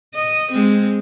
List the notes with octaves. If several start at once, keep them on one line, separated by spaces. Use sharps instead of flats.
D#5
G#3 C4